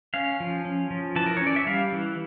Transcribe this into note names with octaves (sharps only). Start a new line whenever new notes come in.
C#4 F5
F3
C#4
F3
E3 A5
A#4
C#5
C#4
D5
E5
G3 F5
E3